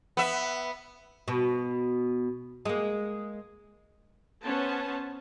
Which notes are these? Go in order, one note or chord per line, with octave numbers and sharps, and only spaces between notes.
B3 E5
B2
G#3 A#3
B3 C#4 C5 C#5 A5